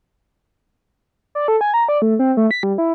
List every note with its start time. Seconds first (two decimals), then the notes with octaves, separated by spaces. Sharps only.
1.35 D5
1.48 A4
1.61 G#5
1.74 A#5
1.88 D5
2.02 A3
2.19 C4
2.37 A3
2.51 B6
2.63 G3
2.78 E4